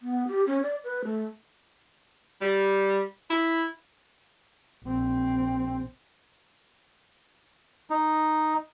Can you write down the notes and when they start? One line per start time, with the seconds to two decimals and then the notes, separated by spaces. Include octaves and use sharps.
0.01 B3
0.28 G4
0.47 C#4
0.63 D5
0.84 B4
1.04 A3
2.41 G3
3.30 E4
4.85 A#1 C4
7.90 D#4